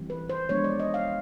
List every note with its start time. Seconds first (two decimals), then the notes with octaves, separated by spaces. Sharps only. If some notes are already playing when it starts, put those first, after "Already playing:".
Already playing: E3 G3 C4
0.10 B4
0.30 C5
0.49 F3 G#3 B3 D4 C#5
0.64 D5
0.80 D#5
0.94 F5